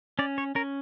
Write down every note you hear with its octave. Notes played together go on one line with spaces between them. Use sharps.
C#4 D5
C#5
C#4 A#4